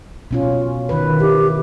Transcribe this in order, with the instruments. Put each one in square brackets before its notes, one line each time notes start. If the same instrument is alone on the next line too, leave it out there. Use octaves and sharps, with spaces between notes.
[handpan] B2 C#4 F4
D#3 B4
[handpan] E4 [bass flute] G4